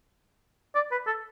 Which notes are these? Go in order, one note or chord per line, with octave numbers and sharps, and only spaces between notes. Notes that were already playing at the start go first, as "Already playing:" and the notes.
D5
B4
A4